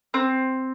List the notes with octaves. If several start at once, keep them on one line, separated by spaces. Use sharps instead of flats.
C4